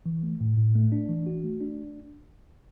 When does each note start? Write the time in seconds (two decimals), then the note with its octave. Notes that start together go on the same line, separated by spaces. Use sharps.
0.06 E3
0.23 A3
0.41 A2
0.57 A2
0.75 A3
0.92 D4
1.09 E3
1.26 F#4
1.44 A3
1.61 D4